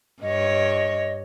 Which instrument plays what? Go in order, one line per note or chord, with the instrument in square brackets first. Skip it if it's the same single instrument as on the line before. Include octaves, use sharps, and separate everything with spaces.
[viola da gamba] G2 C#5 [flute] D#5